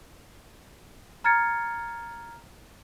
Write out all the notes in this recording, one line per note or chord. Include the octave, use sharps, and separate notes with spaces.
A#5 F6 G#6 A6 C#7